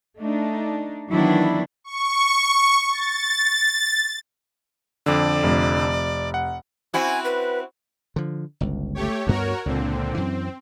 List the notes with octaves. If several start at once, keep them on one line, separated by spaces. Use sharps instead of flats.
A3 D4 D#4
D#3 E3 F#3 B3 D4 E4
C#6
A6
F2 D3 D5
F1
F#5
C4 E4 F#4 G#5
B4
D3 F3
G1 C#2
A3 G4 C#5
D2 G2 B3 F#4 A#4 C#5
C#2 A#2 D3 C4
F#2 E3 C4